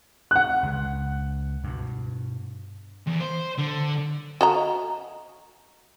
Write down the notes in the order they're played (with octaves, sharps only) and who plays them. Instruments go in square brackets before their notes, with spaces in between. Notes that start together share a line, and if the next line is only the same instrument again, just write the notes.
[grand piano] F#5 F#6
[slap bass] C#2 C#3
G2 B2
[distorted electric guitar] E2
C5
D3
[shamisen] F#4 D#5 A#5